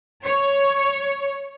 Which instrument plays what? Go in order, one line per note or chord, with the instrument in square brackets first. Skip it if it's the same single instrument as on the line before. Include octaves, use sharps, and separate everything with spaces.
[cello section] C#5